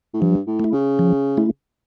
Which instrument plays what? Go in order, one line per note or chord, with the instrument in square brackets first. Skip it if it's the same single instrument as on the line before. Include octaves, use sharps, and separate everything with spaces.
[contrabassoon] A2
[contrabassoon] G2 [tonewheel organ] F3
[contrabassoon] A2
[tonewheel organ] A3 E4
[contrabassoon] C#3
[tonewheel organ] F3
A3 E4